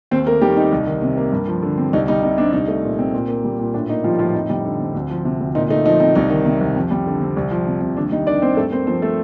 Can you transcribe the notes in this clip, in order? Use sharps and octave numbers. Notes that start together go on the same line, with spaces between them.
D#2 C4 C5
A3 A#3 A#4
D#3 G3 G4
C4 D#4
C2
D#3
C3
A#3
G2
F3
D3
C4
C2 D#4
G3 D#4
C3 D#4
C4 D4
C2 D#4
A3
A#2
C4
A#2
A#3
G3
A#2
A2 D4
A#3 D#4
F3 G3 F4
A2 F3 F4
F2 D#4
G3
D3
C4
D2
F3
C3
D2
A#2 D#4
A3 D#4
F3 D#4
C4 D#4
C2 D#4
D#3
C3
C2
F2
G3
D3
C4
C2
F3
C3
C2
D#2 D4
G3 D#4
D#3 D4 D5
C4 C5
G2 A3 A4
A#3 C4 C5
F3 C4 C5
A3 A4